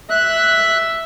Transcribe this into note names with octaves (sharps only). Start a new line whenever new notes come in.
E5 F#6